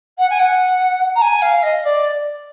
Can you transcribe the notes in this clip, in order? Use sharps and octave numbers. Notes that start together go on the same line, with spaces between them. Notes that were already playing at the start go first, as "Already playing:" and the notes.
F#5
G#5
F#5
A#5
G#5
F5
D#5
D5